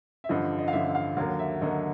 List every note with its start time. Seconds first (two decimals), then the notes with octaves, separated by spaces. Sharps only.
0.24 E5
0.29 A1 G2 D3 F3 D#5
0.58 D#5
0.68 F5
0.73 A1 G2 D3 F3 E5
0.88 E5
0.95 F5
1.17 D#2 D3 F#3 A#3 F5
1.39 E5
1.61 D#2 D3 F#3 A#3 D#5